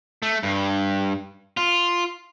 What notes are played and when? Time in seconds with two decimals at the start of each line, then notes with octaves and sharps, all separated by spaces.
0.22 A3
0.43 G2
1.57 F4